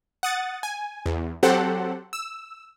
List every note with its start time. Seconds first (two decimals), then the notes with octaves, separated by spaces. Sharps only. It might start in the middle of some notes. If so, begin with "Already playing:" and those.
0.23 F#5 D#6 A6
0.63 G#5
1.06 E2
1.43 F#3 C4 G4 A4 C5 F#5
2.13 E6